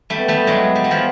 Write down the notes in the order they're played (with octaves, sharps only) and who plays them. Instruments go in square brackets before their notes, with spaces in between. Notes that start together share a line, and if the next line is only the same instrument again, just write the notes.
[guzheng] G3 A3
[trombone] B3
[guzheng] G3 A3
F#3 G#3
G3
F#3
F3 G3